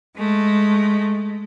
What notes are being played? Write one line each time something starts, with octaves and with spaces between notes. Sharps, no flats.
G#3 A3